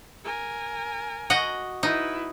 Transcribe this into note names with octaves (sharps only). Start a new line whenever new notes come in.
A#4 G#5
F#4 D#5 F#5
D#4 E4 B4